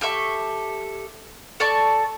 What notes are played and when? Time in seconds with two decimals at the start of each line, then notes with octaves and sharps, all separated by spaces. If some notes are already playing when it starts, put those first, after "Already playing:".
0.01 G4 A4 E5 C#6
1.60 A4 D5 A5 C#6